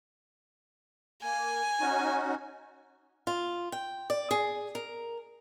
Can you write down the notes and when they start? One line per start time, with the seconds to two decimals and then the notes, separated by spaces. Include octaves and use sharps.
1.23 A#3 G#5
1.81 C#4 D#4 F#4
3.27 F4
3.72 G5
4.10 D5
4.31 G#4
4.75 A#4